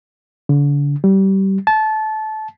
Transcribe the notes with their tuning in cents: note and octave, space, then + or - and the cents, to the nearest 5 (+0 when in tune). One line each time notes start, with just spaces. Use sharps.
D3 -40
G3 -25
A5 -20